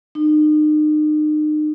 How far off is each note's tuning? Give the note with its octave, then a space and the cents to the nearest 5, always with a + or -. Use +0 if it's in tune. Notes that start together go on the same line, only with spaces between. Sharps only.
D#4 -40